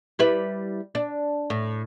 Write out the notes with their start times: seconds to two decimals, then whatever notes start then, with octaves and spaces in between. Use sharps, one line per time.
0.19 G3 E4 B4
0.95 D4
1.50 A2